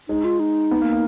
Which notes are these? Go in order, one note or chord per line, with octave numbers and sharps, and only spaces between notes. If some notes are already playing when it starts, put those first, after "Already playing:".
G#3 D#4
F4
D#4
B3
A#3
A#3